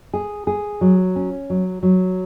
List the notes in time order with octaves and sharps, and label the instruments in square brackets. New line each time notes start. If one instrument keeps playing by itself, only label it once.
[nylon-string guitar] G#4
G#4
F#3
C#4
F#3
F#3